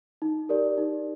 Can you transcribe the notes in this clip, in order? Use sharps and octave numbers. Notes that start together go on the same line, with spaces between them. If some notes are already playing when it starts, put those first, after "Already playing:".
D#4
G4 A#4 D5
D#4